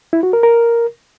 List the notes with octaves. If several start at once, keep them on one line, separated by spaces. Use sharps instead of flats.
E4
F#4
A#4
A#4